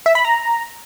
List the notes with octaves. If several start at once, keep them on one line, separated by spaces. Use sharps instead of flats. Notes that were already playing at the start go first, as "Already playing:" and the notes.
E5
B5
A#5